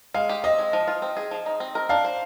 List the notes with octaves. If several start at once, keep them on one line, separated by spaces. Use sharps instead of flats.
G#3 F5
G4
C4 D#5
G#3
F3
F4
C4
G#4
F3
D#4
C4
A#4
D4 F5
C5